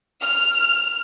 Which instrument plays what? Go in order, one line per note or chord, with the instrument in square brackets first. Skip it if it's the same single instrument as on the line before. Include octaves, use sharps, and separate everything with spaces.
[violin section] F6